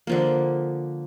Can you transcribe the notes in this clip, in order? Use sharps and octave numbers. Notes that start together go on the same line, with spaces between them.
D3 F3 A#3